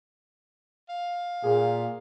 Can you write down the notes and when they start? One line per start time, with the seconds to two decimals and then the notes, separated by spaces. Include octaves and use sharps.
0.89 F5
1.43 A#2 G#4